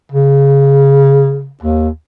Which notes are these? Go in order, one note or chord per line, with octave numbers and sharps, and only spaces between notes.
C#3
D#2